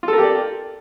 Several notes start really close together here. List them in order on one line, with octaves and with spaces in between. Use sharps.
F4 A4 A#4 G4 D5